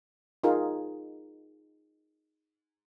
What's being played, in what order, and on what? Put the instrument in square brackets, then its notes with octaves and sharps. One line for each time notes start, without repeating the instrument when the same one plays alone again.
[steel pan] D#4 F4 G#4 A#4